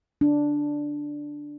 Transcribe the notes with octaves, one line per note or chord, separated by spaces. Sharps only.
D4